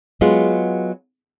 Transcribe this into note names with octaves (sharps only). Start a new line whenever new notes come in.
F#3 G#3 B3 F4